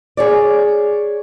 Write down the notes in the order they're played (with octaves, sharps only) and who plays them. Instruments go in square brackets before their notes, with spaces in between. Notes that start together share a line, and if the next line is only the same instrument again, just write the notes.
[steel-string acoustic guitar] G#4 C#5 D5